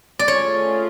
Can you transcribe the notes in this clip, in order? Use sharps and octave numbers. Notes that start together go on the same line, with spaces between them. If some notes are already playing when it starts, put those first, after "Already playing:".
D5
A3 C#4 F4 G#4 C#5